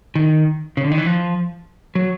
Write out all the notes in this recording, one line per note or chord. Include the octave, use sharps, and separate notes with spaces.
D#3
C#3
D3
D#3
E3
F3
F#3